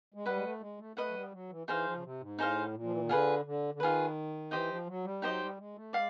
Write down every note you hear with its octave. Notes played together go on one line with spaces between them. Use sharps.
G#3
G3 B4 D#5 F#5
G#3
A3
G#3
A3
A3 B4 D#5 F#5
F#3
G3
F#3
E3
E3 D#4 G#4 C5 F5
F3
C#3
C3
G#2
A2 D#4 G#4 C5 F5
A#2
F3
E3
D#3
D3 F4 G#4 B4
D3
D3
D#3 F4 G#4 B4
E3 D#4 G4 C5 D#5
F3
F#3
G3
F#3 D#4 G4 C5 D#5
G3
G#3
A3
G#3 D5 F5